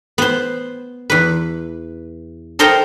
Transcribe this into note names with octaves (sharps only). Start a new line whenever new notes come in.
B3 C5
E2 B4
A4 A#4 C5 D#5 G5 A#5